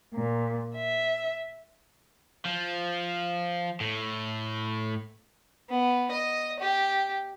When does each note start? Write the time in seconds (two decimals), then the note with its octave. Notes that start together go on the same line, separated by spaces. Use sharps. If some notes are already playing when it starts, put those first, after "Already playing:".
0.13 A#2
0.74 E5
2.45 F3
3.81 A2
5.69 B3
6.11 D#5
6.59 G4